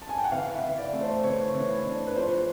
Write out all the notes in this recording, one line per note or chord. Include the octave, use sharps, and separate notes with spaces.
A5
G#5
G5
F#5
E3 F5
E5
E3
D5
A3
C5
E3 C#5
E3
D4
B4
F3 C5